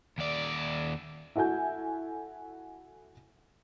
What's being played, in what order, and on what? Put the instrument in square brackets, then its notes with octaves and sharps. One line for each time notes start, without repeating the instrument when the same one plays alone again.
[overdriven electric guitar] D#2 D5
[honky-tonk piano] E4 F#4 A4 G#5 G6